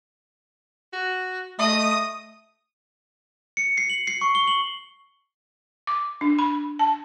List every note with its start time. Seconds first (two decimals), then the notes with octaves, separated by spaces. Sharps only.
0.93 F#4
1.59 A3 D#5 D#6
3.57 C#7
3.78 C7
3.90 F#7
4.07 C7
4.21 C#6
4.35 G7
4.47 F#7
5.87 D6
6.21 D4
6.39 B5
6.79 A5